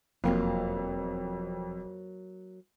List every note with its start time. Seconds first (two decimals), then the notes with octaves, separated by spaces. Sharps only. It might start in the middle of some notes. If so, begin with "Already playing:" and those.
0.24 E1 F2 F#3 A#3 F4